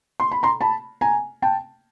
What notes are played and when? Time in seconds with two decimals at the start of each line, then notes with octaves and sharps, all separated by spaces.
0.20 C6
0.32 B5
0.43 A#5 C6
0.61 A5 B5
1.01 G#5 A#5
1.42 G5 A5